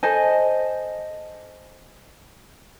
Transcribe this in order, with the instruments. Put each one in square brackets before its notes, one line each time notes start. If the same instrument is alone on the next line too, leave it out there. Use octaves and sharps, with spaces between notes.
[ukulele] A4 C5 D#5 G#5